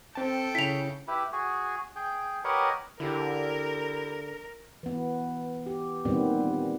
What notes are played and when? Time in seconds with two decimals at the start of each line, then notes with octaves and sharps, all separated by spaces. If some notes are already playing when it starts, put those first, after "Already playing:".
0.15 C4 A4 G5 A5
0.55 C#3 E4 B6 F7
1.08 E4 G4 B4
1.33 F#4 G#4
1.96 G#4 G5
2.44 G4 A#4 B4 C#5 D#5 F#5
3.00 D3 E4 G4 A#4
4.83 E3 B3
5.66 G4
6.05 A#2 D#3 G3 B3 C4